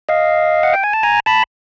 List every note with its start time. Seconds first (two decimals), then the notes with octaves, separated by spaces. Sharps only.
0.09 D#5 F5
0.63 F#5
0.74 G5
0.83 G#5
0.93 A5
1.03 G#5 A#5
1.26 A5 B5